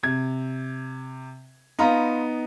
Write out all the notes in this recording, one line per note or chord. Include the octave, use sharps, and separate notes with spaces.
C3 G#6
B3 D#4 F4 A#5 B5